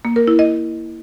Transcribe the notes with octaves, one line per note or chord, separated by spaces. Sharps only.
A#3
A#4
E4
D#5